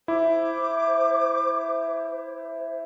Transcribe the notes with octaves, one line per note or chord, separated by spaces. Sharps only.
E4 C5 D6